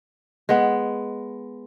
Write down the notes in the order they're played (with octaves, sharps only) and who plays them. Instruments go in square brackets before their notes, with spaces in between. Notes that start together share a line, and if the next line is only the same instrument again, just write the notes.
[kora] G#3 B3